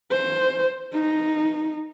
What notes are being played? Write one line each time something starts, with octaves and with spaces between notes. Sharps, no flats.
C5
D#4